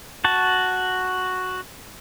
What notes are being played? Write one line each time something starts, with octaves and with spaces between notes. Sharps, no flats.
F#4 A5